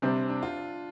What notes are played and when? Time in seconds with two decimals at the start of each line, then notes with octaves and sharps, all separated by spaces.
0.02 C3 G3 C4 D4
0.29 D4
0.43 F4